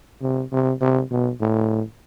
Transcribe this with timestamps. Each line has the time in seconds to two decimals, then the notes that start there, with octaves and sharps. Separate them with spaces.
0.22 C3
0.52 C3
0.81 C3
1.11 B2
1.41 A2